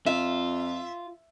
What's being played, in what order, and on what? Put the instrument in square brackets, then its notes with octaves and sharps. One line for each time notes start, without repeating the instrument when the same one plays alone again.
[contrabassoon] F2 [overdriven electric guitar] F4 [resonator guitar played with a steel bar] E5